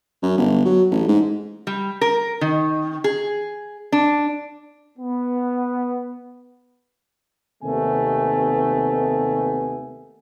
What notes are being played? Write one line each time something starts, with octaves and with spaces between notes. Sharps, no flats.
F#2
G1
F#3
A1
G#2
G3
A#4
D#3
G#4
D4
B3
D#2 C3 D#3 A3 B3 G#5